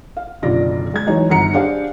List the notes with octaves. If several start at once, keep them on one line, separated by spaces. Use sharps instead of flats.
F5
F#1 B1 D3 F4 D5 A#6
G#3 G#6
E3 F#3 G#3 D#4 C#5
G1 D#3 F#5 A#5 C#7
D4 G4 G#4 C5 F5 F#5